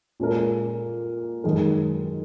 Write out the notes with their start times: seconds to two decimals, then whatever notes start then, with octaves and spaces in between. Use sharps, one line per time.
0.20 A#2 G#3 C#4 F4 A#4
1.44 F#2 D#3 G#3 D#4 A#4